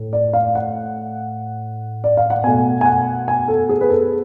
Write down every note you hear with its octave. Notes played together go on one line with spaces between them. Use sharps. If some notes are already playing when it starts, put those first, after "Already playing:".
Already playing: A2
D5
F5
F#5
D5
F5
F#5
B2 A3 G#5
G#5
F#5
G#5
A4
G#4
B4
A4